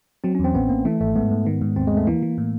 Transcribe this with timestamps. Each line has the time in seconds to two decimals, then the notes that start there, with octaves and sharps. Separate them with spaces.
0.24 F#3 C4
0.35 C#4
0.39 E2
0.44 C4
0.55 A1 B3
0.69 A1 A#3
0.85 E3 A3
1.01 G#1 A3
1.16 G#2 B3
1.31 G#2
1.46 D#3
1.61 G#2
1.76 D#2 C4
1.87 G#3
1.92 D#2
1.97 A3
2.07 E3 A#3
2.22 E3
2.38 A2